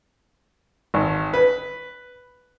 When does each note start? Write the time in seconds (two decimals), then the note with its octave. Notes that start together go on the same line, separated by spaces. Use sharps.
0.94 G#1
1.34 B4